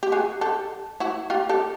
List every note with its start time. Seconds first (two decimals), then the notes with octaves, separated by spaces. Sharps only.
0.03 G4
0.12 F#4 G#4
0.41 G4 A4
1.00 E4 F#4
1.30 F4 G4
1.49 G4 A4